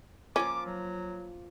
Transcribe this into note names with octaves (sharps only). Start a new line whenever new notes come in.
F3 A#3 C#4 F4 D6
F#3